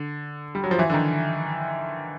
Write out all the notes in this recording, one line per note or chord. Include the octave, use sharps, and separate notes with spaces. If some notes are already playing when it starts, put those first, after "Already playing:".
Already playing: D3
G3
F#3
F3
E3
D3
D#3